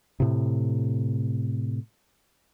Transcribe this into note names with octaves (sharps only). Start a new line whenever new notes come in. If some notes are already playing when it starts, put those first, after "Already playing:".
A2 C3